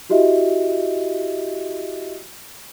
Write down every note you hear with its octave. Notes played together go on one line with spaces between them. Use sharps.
E4 F#4 G4 D#5 E5